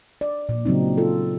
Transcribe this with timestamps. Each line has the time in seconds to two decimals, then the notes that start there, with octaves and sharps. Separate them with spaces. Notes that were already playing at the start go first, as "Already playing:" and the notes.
0.21 D5
0.49 A#2
0.65 C#3 F#3 C4 D#4
0.98 F4 A4